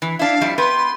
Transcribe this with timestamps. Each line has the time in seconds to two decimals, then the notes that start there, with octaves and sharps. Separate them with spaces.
0.02 E3
0.19 D4 E4 F5
0.41 F2 G3 E4
0.58 B3 G4 B4 C6